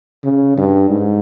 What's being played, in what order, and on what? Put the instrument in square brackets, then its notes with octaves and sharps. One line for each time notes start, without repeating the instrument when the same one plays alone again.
[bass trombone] C#3
G2
G#2